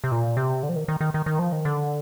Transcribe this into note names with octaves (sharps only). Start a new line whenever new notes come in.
C3
A#2
C3
D3
F3
D#3
D#3
D#3
D#3
D#3
F3
D#3
D3